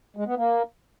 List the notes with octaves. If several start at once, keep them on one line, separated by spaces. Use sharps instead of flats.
G#3
B3
A#3